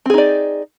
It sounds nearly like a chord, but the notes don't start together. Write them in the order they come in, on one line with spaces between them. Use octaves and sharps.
C4 G#4 D#4 D5